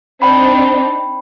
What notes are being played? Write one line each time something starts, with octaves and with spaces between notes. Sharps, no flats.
C4 D4 D#4 G5 B5